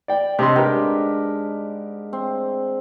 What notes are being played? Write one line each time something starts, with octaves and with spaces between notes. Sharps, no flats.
D5 G5
C3 D4 D#5 C6
G#2 G4 A#4 B4
C4